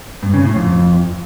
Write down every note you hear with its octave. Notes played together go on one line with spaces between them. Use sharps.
G2
C#3
A2
F2